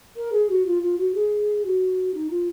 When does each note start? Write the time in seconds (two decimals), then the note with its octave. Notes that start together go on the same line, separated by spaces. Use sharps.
0.16 A#4
0.32 G#4
0.49 F#4
0.66 F4
0.82 F4
0.98 F#4
1.14 G#4
1.65 F#4
2.14 D#4
2.30 F4